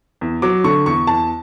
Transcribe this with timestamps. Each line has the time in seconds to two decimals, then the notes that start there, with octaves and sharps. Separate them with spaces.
0.21 E2
0.42 F#3 D6
0.64 D3 C#6
0.86 E2 C#6
1.07 E2 A5